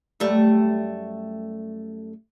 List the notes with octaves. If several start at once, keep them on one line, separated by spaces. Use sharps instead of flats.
F#2 G3 A3